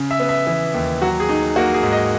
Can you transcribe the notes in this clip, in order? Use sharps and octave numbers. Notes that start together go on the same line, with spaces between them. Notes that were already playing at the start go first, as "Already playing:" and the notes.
Already playing: C#3
E5
B3
E5
E3
D#2
F#3 F#4
G#4
D#4
A#3 F#4
G#4
G#2
D#5